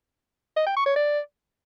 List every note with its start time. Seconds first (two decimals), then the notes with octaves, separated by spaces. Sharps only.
0.56 D#5
0.66 G5
0.76 C#6
0.86 C#5
0.96 D5